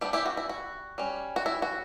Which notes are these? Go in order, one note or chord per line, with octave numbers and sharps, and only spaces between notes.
G3 B3 D4 E4 G4
E4 G4
F#4
E4
F#4
G3 C#4
F#4
E4
F#4